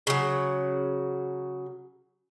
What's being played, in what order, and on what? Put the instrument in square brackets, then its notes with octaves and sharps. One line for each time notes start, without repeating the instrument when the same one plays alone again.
[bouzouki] C#3 F#3